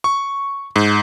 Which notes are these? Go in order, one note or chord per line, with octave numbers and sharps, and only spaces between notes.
C#6
G#2